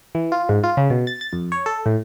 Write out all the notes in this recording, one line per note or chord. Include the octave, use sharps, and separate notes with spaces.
E3
F4
G#2
F4
C#3
B2
A6
A6
F2
C#5
A4
A2